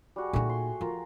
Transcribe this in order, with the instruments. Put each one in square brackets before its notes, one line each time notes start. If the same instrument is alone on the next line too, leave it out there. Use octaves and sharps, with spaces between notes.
[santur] G3 F#4 G#4
[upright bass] A#2 D#4 [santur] A3 F#4 G#4
[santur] C6
[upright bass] F3 [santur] F4 A#4